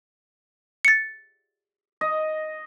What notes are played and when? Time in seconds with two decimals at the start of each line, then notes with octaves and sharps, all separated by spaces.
0.85 A6 C#7
2.01 D#5